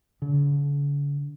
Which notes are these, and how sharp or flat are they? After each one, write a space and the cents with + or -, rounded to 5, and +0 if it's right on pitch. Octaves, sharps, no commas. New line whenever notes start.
D3 -45